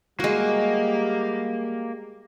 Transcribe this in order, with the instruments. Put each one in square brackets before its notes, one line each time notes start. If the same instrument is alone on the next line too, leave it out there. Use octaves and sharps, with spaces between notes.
[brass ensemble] G3 G4 [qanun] G#3 F#4 [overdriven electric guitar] A#3